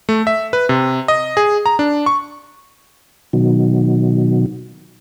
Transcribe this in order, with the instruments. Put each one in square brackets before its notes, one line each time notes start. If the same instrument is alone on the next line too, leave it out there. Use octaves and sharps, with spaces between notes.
[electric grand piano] A3
E5
B4
C3
D#5
G#4
A#5
D4
C#6
[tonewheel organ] B2 D#3 F#3